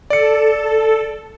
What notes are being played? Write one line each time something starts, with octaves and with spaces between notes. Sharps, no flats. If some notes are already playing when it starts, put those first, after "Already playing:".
A4 D5 C#7